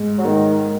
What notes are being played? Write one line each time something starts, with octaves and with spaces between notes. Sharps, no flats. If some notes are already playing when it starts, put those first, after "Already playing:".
Already playing: G#2
F#3
G#2 D#3